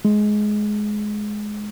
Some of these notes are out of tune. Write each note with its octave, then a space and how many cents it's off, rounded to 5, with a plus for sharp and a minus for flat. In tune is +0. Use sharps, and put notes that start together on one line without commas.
G#3 +15